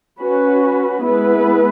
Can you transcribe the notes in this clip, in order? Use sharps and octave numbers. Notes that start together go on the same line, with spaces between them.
C#4 F#4 B4
G#3 B3 E4 B4